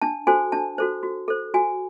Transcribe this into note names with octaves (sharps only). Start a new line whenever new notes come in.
D4 A5
F#4 A4 C5 G#5
D4 A5
F#4 A4 C5
F#4
A4 C5
F#4 G#5